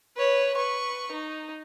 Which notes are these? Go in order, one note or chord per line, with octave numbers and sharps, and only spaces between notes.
B4 C#5
B4 C#6
D#4